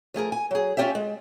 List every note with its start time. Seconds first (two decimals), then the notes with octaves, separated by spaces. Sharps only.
0.14 F3 A3 G#4 A#4
0.32 G#5
0.51 F#3 G#4
0.77 C#4 F4 G4 C#5 E5
0.95 G#3